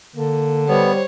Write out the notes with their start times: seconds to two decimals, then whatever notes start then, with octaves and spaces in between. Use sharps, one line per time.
0.16 D3 A#3
0.68 G3 B3 C5 C#5